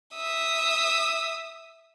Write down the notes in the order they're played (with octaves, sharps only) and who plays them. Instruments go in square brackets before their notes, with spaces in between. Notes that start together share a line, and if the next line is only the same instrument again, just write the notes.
[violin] E5 D#6